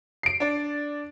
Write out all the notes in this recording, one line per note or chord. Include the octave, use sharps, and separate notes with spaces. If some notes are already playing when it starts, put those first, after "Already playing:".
C7 D7
D4 D5